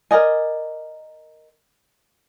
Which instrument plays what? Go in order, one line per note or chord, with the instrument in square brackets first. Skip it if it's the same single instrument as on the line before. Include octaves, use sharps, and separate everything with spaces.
[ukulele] A#4 D5 D#5 G#5